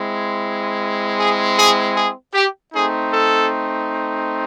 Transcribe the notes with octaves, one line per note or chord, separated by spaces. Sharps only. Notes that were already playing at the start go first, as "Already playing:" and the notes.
Already playing: G#3 C4 E4
G#4
G#4
G#4
G4
A3 C4 D#4 G#4
A4